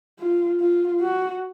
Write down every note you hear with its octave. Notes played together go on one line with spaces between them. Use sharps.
F4
F4
F#4